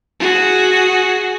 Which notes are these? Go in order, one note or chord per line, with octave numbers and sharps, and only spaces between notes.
F#4 G#4